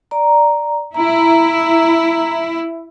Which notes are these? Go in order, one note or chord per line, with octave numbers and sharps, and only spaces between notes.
D5 A#5
E4 A#5